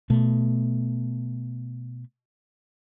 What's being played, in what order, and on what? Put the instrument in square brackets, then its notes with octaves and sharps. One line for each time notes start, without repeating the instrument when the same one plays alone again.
[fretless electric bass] B2 A3